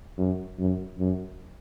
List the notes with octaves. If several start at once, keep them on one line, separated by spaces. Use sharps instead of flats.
F#2
F#2
F#2